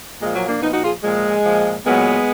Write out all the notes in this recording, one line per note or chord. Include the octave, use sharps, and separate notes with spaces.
A#2 F3 G#3
F#3 A#3
A#3 D4
A#2 F3 B3 D#4
D#4 F#4
F4 G#4
A#2 F3 G#3
A#2 F3
A#2 F#3 G#3 B3